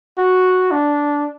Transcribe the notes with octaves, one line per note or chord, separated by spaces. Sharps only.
F#4
D4